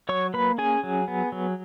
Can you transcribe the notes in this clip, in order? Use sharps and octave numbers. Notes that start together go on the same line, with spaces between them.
F#3 C#5 C#6
A#3 B4 B5
C#4 G#4 G#5
F#3
B3
F#3